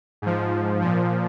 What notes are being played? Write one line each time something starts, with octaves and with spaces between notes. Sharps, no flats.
G#2 F3
A#2 F3